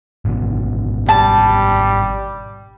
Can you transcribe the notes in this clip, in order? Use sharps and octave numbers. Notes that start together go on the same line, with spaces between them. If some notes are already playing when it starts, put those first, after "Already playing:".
G#1 B2 D3
G3 A5